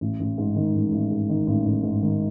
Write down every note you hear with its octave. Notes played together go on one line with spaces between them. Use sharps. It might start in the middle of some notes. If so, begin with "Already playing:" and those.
A1
A1
G#2
D#3
A1
A1
G#2
D#3
A1
A1
G#2
D#3